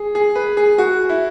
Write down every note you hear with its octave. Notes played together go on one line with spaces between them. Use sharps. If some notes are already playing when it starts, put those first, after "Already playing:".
Already playing: G#4
G#4
B4
G#4
F#4
E4